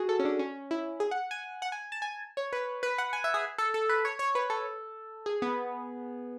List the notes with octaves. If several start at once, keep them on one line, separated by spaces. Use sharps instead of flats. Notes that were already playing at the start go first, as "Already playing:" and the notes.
Already playing: F#4 G#4
A4
C#4
D4
C#4
E4
G#4
F#5
G#5
F#5
G#5
A5
G#5
C#5
B4
B4
F#5
G#5
E5
G#4
A4
A4
B4
C#5
C#5
B4
A4
G#4
B3